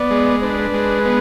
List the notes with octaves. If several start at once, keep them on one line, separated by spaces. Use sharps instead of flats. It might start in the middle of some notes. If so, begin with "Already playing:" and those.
Already playing: B3 D5
G#3
D4 B4
G#3
B3